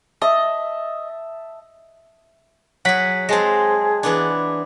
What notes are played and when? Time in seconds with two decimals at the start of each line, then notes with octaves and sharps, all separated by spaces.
0.22 D#5 E5 A5
2.85 F#3 G#4 F#5 B6
3.29 G#3 C4 G#4 A5 C6 A#6
4.03 E3 B3 D4